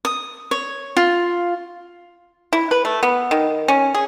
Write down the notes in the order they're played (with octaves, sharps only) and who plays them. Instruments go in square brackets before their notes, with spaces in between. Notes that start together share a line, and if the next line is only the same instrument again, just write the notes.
[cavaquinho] D#6
C#5
F4
[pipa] E4
B4
A3
B3
D#3
C#4
G#4